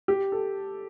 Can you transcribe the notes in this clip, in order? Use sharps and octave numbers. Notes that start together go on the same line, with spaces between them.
G4
A4